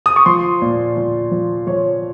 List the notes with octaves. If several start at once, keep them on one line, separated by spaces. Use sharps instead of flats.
D#6
C#6
F3 C6
A#2
F3
F3
F3 C#5